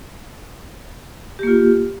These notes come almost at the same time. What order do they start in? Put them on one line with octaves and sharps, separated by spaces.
G4 A#3 F4